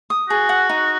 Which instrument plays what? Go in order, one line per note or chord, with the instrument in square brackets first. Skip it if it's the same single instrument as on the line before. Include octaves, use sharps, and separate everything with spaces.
[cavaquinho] D#6
[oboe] F#4 [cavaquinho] G#4
[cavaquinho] F#5
D#4